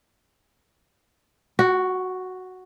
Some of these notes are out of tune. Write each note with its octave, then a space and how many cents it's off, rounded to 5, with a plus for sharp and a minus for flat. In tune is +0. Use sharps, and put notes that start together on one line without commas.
F#4 +0 F#5 +45